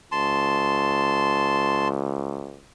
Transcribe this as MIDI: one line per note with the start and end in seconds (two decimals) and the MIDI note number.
0.12 2.61 37
0.12 1.88 81
0.12 1.88 84